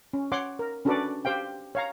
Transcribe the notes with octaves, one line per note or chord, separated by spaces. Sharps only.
C#4
C#5 F#5 C6 D6
A#4
C#4 D4 F#4 A4 B4 D5
G4 C5 F5 G5
C#5 F5 A#5